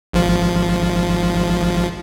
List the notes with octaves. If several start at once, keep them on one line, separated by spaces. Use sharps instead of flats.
G#1 F3